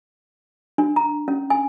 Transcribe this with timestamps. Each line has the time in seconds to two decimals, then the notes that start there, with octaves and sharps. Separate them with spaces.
0.78 D4
0.96 A#5
1.28 C#4
1.50 G#5